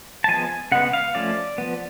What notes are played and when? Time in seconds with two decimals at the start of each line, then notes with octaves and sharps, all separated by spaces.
0.24 A5
0.28 F3 G#3 B3 G#5
0.72 C#3 G#3 B3 F#5
0.93 F5
1.15 F3 A3 C#4 D5
1.58 F3 B3